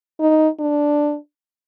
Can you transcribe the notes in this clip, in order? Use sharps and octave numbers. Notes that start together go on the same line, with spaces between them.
D#4
D4